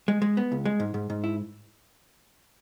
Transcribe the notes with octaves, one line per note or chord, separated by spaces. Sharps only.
G#3
G#3
B3
C#2
G#3
G#2
G#2
G#2
E4